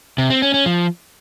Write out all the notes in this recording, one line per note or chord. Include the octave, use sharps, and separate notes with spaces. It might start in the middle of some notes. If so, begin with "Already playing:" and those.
C3
C4
C#4
C#4
F3